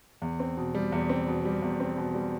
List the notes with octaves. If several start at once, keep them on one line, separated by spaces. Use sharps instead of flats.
E2
C4
B2
G3
E2
C4
B2
G3
E2
C4
B2
G3